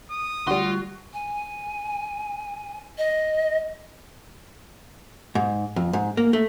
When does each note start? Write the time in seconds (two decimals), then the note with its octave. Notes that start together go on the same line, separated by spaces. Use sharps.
0.11 D#6
0.47 D2 G3 F4 F#4 C6
1.13 G#5
2.98 D#5
5.35 G#2
5.76 F2
5.93 G#2
6.17 A#3
6.33 A3